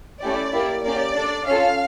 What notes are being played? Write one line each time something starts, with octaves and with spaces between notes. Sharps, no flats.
A3 C#4 E4 G4 D5
A#3 E4 G4
A#3 C#4 G4 D5
D4 A4
C#4 F4 A4 F5